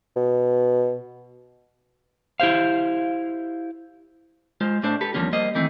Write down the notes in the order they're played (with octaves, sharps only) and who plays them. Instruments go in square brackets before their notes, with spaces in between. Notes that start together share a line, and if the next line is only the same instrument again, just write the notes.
[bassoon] B2
[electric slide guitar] E4 G4 C5 F5
[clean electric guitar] G#3 F4 C5
A2 A3 D4 A4 C5 D5
G4 A4 B4
E2 C#3 F3 G3 A#3 C#4
G3 A#3 C5 D#5
D#3 E3 A3 C4